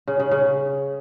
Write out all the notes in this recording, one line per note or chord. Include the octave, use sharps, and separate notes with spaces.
C#3
C#3
C#3